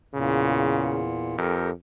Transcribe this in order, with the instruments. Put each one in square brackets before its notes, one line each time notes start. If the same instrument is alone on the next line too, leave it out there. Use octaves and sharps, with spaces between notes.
[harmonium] E2 A#2 [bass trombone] C#3
[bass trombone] F2 [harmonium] G4 A4 A#4